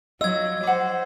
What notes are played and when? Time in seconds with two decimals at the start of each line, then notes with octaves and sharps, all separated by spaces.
0.21 F#3 F4 D#5 E6 G#6
0.63 C5 F#5 D6